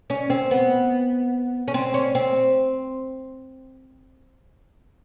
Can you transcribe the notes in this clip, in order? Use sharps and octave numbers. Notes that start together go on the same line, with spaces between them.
C#4
C4
B3
C#4
C4
C#4
C4